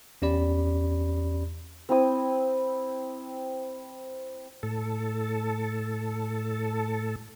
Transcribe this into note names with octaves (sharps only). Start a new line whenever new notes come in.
E2 C#4 G4 D5 B5
C4 E4 D#6
A2 A4